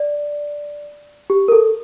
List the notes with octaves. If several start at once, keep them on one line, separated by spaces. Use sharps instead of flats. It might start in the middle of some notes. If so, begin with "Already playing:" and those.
Already playing: D5
G4
A#4
A4